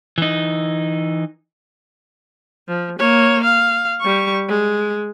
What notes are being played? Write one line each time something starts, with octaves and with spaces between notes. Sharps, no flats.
E3 D#4
F3
A#3 C#5
F5
G3 C#6
G#3